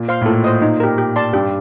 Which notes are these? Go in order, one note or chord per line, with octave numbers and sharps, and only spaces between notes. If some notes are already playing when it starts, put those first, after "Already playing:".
Already playing: A#2
C5 F5 C6
A2
A#2 A4
C5 D#5
D#4
G4 A#4
G4
D5 A5 C6
G2 G4